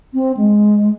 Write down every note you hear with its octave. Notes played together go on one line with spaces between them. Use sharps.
C4
G#3